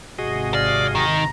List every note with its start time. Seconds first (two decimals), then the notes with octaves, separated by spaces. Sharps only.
0.19 G#1 C3 F#4 G#4 D#5
0.54 D5 F5
0.95 D#3 A#5